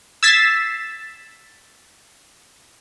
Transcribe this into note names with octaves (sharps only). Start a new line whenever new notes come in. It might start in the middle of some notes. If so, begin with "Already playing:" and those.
E6 G#6 A6 B6 C7 E7